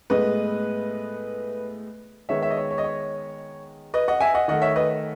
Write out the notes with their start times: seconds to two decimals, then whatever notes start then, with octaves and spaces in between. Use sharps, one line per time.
0.10 A2 G#3 B3 B4 D#5
2.29 D#3 G#3 B3 C#5 E5
2.42 C#5 E5
2.50 D#5
2.57 C#5
2.71 C#5
2.78 D#5
2.84 C#5
3.94 B4 D#5
4.08 D#5 F#5
4.20 E5 G#5
4.34 D#5 F#5
4.48 D#3 A3 D#5 F#5
4.62 C#5 E5
4.76 B4 D#5